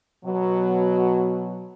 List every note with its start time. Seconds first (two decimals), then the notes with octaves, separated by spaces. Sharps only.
0.25 B2 F#3